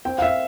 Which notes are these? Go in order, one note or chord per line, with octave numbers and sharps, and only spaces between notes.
C4 G5
F5
E5